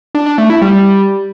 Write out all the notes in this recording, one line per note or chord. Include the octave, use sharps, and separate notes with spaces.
D4
D4
A3
E4
G3